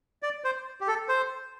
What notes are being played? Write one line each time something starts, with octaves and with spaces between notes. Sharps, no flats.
D5
C5
G4
A4
C5